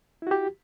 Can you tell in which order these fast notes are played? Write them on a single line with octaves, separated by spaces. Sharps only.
E4 F#4 G4